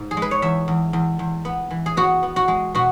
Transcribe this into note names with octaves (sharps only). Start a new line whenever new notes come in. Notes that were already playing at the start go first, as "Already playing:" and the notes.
Already playing: G#2
G#4
G#3
B4
C#5
E2 E5
E2
E2
E2
B3
E3
G#4
B3 F#4
B3
F#4
G#3
B2 F#4